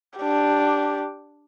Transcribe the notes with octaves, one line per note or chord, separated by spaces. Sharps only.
D4 G4